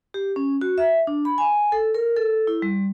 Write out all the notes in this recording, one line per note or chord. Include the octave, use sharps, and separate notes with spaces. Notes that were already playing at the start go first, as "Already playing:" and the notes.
G4
C#4
F#4
E5
D4
B5
G#5
A4
A#4
A4
E4
G3